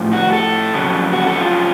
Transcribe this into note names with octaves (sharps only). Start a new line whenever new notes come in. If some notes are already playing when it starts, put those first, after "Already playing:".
Already playing: A2 F3
F#4
A4
F2 C#3 F#3
F#4
A4
F4